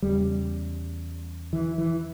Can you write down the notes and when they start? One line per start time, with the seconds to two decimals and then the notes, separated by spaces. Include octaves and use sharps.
0.02 E2 C#3 G3
1.53 E3
1.78 E3